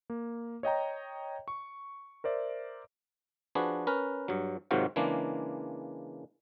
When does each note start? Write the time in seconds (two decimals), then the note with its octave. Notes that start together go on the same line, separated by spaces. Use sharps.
0.10 A#3
0.63 C#5 D#5 G5 A#5
1.48 C#6
2.24 A#4 C5 D5 E5
3.55 F3 D4 F#4 G#4 B4
3.87 C#4 A#4 B4
4.28 G2 F#3
4.71 G#2 C3 D#3 F#3 F4 F#4
4.96 C#3 E3 G#3 A#3 D4